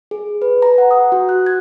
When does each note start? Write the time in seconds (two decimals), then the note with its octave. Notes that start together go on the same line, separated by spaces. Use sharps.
0.11 G#4
0.42 B4
0.62 A#5
0.78 F#5
0.91 D#6
1.12 F#4
1.29 F#6
1.46 G#6